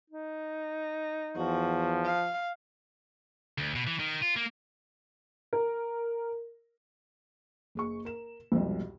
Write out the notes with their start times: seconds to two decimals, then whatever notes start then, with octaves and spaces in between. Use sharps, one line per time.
0.10 D#4
1.37 E2 F3 F#4
2.06 F5
3.58 D2
3.75 B2
3.87 E3
3.99 D#3
4.22 F4
4.36 A#3
5.53 A#4
7.75 F#1 G#4 C#6
8.05 A#4 E7
8.52 C2 F2 G#2 B2